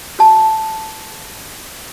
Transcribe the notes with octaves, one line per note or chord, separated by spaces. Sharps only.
F#4 A5